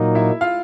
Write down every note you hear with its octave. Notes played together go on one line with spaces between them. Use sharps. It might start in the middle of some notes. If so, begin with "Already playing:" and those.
Already playing: A#2 F#3 A#3 D#4
E4 E5
F4 F5